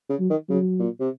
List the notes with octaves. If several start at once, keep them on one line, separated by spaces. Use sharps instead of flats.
C#3
F#3
D#3
C#3 F#3
A#2
C3